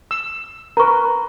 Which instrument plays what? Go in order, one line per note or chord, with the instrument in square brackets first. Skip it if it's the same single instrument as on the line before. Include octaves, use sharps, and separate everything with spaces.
[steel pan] E6
[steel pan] A#4 B4 [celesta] A#5 C#6